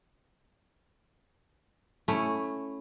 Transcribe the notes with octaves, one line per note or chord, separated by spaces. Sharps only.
A3 C#4 E4